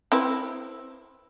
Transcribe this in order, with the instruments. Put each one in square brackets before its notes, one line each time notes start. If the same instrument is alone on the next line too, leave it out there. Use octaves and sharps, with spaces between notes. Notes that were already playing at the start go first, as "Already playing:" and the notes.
[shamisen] C4 E4 B4